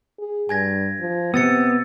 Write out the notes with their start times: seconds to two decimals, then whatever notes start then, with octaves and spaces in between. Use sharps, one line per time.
0.19 G#4
0.49 G2 G#5 G#6 A#6
1.00 F3
1.34 C3 B3 E6 A6 C#7